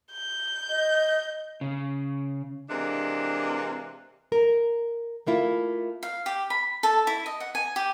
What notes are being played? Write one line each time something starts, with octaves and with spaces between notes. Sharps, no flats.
G6
D#5
C#3
C3 E3 G#3 A#3 D4
A#4
A3 A#3 E4 F4
F5
G4
B5
A4
E4
D#5
F#5
G#5
G4